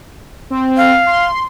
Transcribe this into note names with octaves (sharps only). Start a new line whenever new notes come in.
C4
F5
C6